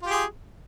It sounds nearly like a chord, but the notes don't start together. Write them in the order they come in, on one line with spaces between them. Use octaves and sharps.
F4 G4 G#4